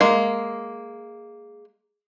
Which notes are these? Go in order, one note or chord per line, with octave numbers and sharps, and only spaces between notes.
G#3 A#3